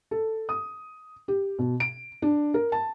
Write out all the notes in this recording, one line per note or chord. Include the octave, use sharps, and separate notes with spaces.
A4
D#6
G4
B2
D7
D4
A#4
A5